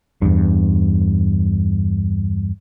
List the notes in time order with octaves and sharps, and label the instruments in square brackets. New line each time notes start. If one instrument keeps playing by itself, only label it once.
[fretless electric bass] E2 G2